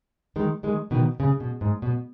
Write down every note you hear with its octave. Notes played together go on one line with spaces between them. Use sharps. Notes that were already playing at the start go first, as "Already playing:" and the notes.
D#3 G#3
D#3 G#3
B2 D#3
C#3
B2
G#2
B2